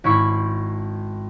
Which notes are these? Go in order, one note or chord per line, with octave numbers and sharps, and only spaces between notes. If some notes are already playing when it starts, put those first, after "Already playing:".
G#1 C#4 E4 B5 C#6